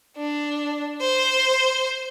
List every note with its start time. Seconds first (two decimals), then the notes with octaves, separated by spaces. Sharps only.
0.17 D4
1.02 C5